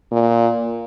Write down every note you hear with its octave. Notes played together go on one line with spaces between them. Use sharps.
A#2